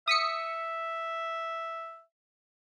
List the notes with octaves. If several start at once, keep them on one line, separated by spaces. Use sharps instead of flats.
E5 D#6 B6 C#7